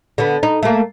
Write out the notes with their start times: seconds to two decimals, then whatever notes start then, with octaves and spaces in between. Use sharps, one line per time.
0.18 D3 B3
0.43 D#4
0.63 A3 A#3